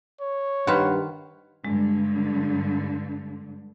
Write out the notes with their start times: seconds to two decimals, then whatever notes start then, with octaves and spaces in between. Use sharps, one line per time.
0.21 C#5
0.67 G2 D#3 B4 C5 F5 F#5
1.65 G2 D3 G#3